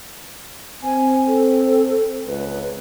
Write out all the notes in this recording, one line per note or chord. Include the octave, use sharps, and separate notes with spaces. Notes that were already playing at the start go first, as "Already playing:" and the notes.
C4 G#5
A4
C#2 B4